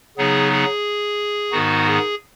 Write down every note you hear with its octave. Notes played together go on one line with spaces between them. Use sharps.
C#3 F#3 B3 D#4 G#4
G#4
G#2 D#3 B3 D#4 F#4
G#4